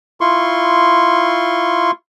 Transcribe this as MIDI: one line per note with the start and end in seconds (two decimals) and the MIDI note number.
0.21 1.91 64
0.21 1.91 65
0.21 1.91 84
0.21 1.91 85